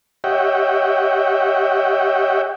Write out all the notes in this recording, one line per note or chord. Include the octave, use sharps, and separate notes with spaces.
G4 C#5 D#5 E5 F#5 G5